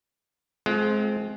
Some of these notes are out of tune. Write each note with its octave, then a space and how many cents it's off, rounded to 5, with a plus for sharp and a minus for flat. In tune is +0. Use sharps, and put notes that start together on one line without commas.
G#3 +30 C4 +0 F4 +0